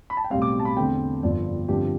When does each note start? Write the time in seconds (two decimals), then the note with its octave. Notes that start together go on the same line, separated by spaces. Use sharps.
0.10 B5
0.17 A5
0.24 G5
0.30 B1 A2 G3 C4 F5
0.42 D6
0.60 A5
0.65 B5
0.77 E2 D3 A3 C4 G5
1.23 G1 F2 D3 F3 C4 D5
1.68 G2 D3 F3 C4 G4